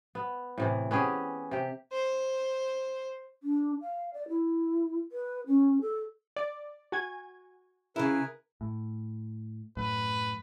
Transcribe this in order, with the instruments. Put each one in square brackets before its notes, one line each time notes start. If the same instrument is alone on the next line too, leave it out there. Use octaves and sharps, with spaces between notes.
[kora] B3
A2 C3 E3
B3 C#4 G4 G#4
C3 G4
[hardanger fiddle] C5
[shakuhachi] D4
F5
D5
E4
B4
C#4
A4
[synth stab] D5
[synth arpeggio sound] F#4 G#5 G#6
[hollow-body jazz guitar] C#3 E4 [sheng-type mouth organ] G#4 A#4 B4
[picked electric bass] A2
[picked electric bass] F#2 A2 [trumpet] B4